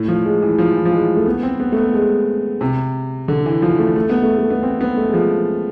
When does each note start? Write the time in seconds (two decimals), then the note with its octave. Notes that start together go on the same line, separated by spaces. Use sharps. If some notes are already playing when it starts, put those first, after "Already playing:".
Already playing: A2
0.08 F3
0.25 G#3
0.42 E3
0.58 F3
0.76 E3
0.85 F3
0.92 G#3
1.16 A3
1.26 B3
1.43 C4
1.60 B3
1.72 A3
1.77 B3
1.94 G#3
2.61 C3
3.28 D3
3.46 E3
3.62 F3
3.79 A3
3.96 A3
4.10 B3
4.23 A3
4.38 A3
4.50 B3
4.63 C4
4.81 B3
4.97 A3
5.09 G#3
5.14 F3